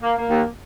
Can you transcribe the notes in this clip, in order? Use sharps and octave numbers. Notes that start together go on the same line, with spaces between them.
A#3
A#3
D#2